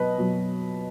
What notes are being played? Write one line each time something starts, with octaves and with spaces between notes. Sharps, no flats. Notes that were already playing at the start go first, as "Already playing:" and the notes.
Already playing: B2 F#3 B4 D#5
B2 F#3